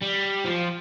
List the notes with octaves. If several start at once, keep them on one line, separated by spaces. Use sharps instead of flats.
G3
F3